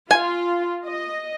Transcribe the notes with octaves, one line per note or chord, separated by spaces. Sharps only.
F4 G#5
D#5